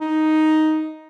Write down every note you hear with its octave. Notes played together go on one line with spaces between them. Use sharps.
D#4